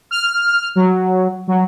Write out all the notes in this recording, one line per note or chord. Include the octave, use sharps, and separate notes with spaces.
F6
F#3
F#3